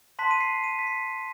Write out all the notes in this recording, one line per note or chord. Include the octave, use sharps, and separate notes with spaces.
A5 C6 F#6 B6
D#7
C7
D#7
B6
C7